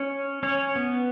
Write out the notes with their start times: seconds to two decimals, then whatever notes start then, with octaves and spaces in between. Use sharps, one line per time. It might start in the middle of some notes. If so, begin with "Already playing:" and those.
Already playing: C#4 C#5
0.43 C#4 C#5
0.76 B3